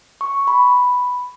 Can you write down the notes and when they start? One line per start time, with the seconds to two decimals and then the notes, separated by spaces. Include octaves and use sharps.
0.21 C#6
0.48 B5